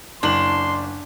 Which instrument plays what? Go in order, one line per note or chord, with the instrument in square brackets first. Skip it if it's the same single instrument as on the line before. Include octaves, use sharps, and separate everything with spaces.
[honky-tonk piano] F#1 F#7 [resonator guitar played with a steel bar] D4 [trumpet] C6